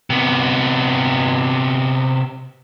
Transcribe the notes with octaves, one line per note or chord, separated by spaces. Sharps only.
C3 B3